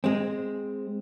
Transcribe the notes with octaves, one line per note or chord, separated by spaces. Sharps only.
G#3 C4